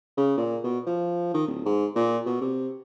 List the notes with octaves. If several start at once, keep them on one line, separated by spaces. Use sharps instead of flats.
C#3
A#2
B2
F3
D#3
D1
G#2
A#2
B2
C3